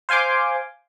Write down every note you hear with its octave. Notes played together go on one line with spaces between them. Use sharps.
C5 F5 G#5 C6 D6